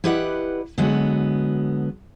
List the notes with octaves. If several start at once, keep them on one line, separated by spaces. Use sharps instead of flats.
E4 G4 B4 D5 D#5 F#5
D3 F#3 G#3 B3 F#4